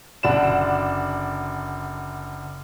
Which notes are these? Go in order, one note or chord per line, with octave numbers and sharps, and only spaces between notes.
F#1 D3 D4 D5 F#5 E7